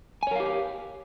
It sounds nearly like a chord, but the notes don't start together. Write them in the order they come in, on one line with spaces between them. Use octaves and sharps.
G#5 C#5 A#4 F5 G4